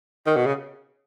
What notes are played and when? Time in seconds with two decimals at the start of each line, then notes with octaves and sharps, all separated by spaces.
0.27 D#3
0.36 B2
0.46 C#3